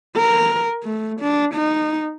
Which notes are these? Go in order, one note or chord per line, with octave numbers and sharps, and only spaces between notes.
A#4
A3
D4
D#4